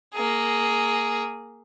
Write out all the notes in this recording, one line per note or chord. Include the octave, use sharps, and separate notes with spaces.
A#3 G#4